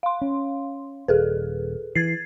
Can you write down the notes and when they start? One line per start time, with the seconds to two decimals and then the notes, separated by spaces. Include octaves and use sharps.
0.03 F5 C6
0.21 C#4
1.08 D#1 G#4 A4 B4
1.95 E3 G#6 A6 C7